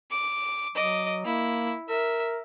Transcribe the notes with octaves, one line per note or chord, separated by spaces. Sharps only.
D6
F#3 D#5 D6
A#3 E4
A#4 E5